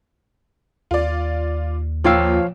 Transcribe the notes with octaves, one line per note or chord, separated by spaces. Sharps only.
D#2 F4 D5
A#2 F3 F4 C#5 F5 G5 E6